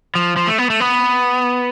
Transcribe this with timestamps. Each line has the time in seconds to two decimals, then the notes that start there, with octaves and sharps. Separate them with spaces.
0.15 F3
0.36 F3
0.47 A3
0.58 B3
0.70 A3
0.80 B3